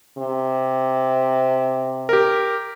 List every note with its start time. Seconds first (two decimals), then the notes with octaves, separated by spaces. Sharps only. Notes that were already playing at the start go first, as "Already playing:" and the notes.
0.18 C3
2.09 G4 A#4